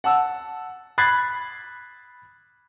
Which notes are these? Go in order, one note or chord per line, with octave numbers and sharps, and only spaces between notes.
F#5 A5 E6
B5 F#6 G#6 A6 C7